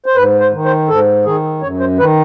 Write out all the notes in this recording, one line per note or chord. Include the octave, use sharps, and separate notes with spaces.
C5
G#2 B4
C5
D#3
C5
G#2 A4
D#3 G#4
F#2 C#5
C5
D#3 B4